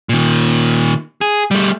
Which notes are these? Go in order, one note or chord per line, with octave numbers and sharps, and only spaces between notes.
A#2 D#3
G#4
G3 A3